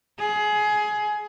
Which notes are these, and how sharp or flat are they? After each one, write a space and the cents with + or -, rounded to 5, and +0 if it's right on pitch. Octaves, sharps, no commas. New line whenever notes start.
G#4 +20